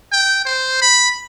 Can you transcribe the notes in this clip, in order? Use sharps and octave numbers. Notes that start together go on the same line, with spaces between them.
G5
C5
B5